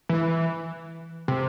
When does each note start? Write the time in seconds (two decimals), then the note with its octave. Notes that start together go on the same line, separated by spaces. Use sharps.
0.09 E3
1.28 C3